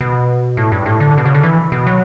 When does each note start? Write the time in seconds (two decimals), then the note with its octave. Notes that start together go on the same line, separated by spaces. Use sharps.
0.01 B2
0.57 A2
0.72 G2
0.86 A2
1.00 D3
1.18 B2
1.25 C#3
1.34 D3
1.43 E3
1.72 B2
1.87 F#3